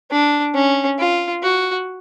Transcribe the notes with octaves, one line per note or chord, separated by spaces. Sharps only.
D4
C#4
F4
F#4